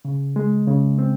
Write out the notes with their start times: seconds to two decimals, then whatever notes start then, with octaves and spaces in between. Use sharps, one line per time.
0.05 C#3
0.36 G#3
0.67 C#3
0.99 C4